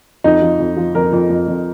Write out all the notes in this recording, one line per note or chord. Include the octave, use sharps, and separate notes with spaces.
F2 D#4
F3
F2
F3
F2 A#4
F2
F2
F2